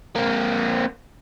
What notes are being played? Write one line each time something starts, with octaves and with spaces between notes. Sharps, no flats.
A#3 C4